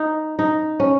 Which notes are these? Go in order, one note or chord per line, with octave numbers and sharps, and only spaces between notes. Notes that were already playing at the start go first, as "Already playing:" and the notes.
Already playing: D#4
D#4
C#4